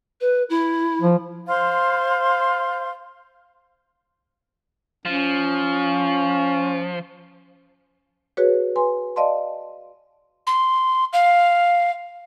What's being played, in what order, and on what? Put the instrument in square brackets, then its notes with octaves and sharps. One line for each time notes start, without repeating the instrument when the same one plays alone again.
[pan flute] B4
E4
[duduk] F3
[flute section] C5 F5 C6
[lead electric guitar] F3 [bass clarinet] C#4
[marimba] F#4 G#4 B4 C#5
B4 G#5 C6
D5 D#5 F5 A5 C6
[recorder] C6
F5